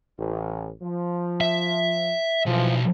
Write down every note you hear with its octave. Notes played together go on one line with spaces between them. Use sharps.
A1
F3
E5
B1 E3 F3